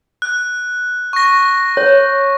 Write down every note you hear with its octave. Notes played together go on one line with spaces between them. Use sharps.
F#6
C#6 A#6
C#5